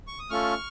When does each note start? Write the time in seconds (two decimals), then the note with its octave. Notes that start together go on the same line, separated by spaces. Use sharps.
0.07 C#6
0.19 D#6
0.30 A3 C#4 F4 A4 C#6 F6